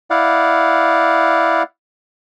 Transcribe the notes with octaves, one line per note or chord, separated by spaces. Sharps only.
E4 D5 F5 F#5